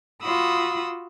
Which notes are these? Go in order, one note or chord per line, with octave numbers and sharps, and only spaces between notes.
F4 F#4 B5 D#6 E6